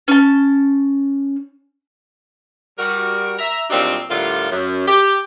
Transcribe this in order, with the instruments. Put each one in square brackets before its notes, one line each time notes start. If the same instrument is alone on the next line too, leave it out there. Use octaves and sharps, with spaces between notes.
[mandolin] C#4 A5
[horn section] G3 F#4 A#4
E5 A#5
A#2 F#3 G3 C4 D4 D#4
A2 D3 G3 A#3 F4
F#2
G4